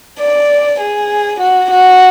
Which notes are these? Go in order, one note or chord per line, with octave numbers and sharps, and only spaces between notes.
D5
G#4
F#4
F#4